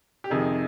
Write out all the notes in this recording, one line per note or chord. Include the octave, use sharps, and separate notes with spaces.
G4
F2 C3 D#3 G#4